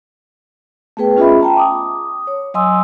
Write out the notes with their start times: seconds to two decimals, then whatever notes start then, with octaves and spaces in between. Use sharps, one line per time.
0.97 A3 B3 G#4 B4 G5
1.17 C#4 F4 G#4 D#5 E5 B5
1.40 G5 A5 A#5
1.57 D6 D#6
2.27 C#5
2.54 F#3 D#5 G#5 C6 D#6 E6